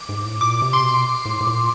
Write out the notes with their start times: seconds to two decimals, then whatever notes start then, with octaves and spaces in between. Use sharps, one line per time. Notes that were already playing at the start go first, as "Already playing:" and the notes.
Already playing: D6
0.09 G#2
0.25 A2
0.41 A#2 D6
0.62 C3
0.73 C6
0.83 B2
1.25 A2
1.41 A2
1.47 A#2